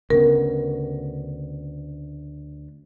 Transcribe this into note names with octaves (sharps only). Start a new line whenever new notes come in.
D2 C#3 B3 A#4